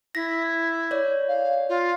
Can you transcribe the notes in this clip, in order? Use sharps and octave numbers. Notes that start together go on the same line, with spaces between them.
E4 A#6 B6
C#5 D5
F5
F4